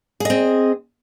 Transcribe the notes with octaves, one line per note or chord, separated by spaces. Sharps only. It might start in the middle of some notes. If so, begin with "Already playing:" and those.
C4 G#4 D#5